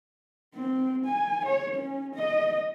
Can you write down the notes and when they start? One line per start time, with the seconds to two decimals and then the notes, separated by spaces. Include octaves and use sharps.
0.55 C4
1.05 G#5
1.45 C#5
1.75 C#4
2.15 D#5